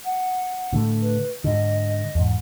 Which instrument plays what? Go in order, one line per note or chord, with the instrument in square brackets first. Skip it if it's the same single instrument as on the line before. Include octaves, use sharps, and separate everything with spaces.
[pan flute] F#5
[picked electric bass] A2 D3 A3
[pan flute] B4
[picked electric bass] G#2 D3 [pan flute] D#5
[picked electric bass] E2 G#2